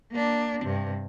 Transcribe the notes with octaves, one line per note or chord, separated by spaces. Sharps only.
A#3 D4
G2 C3